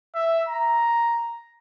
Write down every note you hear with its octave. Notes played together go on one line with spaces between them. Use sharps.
E5
A#5